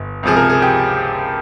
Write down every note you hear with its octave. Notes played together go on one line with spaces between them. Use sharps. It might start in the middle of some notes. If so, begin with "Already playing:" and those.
Already playing: G1
C#2 C3 F3 G#4
A#4
G#4
G4